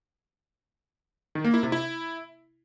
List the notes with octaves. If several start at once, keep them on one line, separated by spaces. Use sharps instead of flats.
D#3
A#3
E4
C3
E4